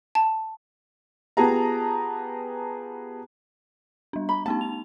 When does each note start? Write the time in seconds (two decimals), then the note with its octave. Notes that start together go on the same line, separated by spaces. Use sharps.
0.15 A5
1.37 B3 F4 G4 G#4 A5 A#5
4.13 G3 D4
4.29 A#5 B5
4.46 A3 B3 D#4 A5
4.61 F7